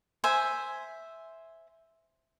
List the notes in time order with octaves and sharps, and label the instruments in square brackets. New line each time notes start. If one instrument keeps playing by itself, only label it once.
[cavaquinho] C5 E5 G#5